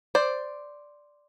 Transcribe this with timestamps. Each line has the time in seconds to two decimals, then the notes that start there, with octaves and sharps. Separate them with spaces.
0.15 C5 D5